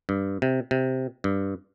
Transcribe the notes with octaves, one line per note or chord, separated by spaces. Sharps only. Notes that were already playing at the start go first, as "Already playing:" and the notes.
G2
C3
C3
G2